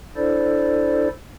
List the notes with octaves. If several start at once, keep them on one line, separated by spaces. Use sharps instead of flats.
D4 E4 A4 C5 D5